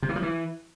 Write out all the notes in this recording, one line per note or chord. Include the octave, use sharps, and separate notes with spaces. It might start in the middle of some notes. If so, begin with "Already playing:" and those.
C3
E3
F3
E3